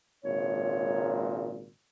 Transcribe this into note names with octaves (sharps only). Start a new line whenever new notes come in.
G#1 C#2 A#2 C#5